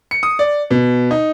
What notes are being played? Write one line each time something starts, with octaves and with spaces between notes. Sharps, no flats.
C#7
D#6
D5
B2
D#4